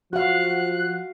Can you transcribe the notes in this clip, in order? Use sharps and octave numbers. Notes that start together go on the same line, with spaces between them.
F3 F#4 F5 F#6